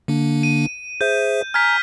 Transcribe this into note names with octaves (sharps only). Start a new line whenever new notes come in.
D3 A#3 D4
D#7
G#4 C5 E5 G6
G#5 A#5 F6 G#6 B6